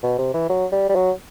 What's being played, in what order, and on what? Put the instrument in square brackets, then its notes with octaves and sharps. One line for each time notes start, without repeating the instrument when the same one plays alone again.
[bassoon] B2
C3
E3
F#3
G3
G3
F#3